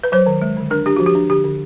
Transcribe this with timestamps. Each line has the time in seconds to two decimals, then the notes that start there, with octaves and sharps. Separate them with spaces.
0.04 B4
0.12 F#3 C5
0.27 D#3
0.42 G#3
0.57 D3
0.70 D4 A#4
0.86 D4 G4
0.96 F3 F#4
1.06 G4
1.15 D4
1.30 D3 G4
1.45 D3